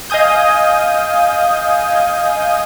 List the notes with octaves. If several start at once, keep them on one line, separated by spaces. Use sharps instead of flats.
D#5 F5 G#5 D#6 G6